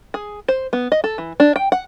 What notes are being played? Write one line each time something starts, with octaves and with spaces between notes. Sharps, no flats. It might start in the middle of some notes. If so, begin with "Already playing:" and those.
G#4
C5
B3
D#5
A4
E3
D4
G5
F#5